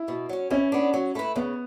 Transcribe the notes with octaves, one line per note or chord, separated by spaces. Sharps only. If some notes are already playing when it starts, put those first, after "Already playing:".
Already playing: E4
B2
F#3 C#4
E3 C#4
B3 D4
F#3
A3 E4 B4
C#3 B3